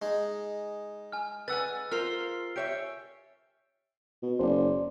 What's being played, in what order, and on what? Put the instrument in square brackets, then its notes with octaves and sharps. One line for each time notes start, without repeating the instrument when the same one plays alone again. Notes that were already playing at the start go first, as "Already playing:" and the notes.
[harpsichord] G#3 D#4 G#4
[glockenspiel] G#5 F6
[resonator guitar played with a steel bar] B4 F#5 G#5 [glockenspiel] E6 A6
[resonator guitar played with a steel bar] F4 A#4 C5 [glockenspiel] F6 C7 G7
[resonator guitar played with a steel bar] G4 C#5 E5 [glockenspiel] D7
[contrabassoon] B2
[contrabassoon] F#1 [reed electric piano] C5 D5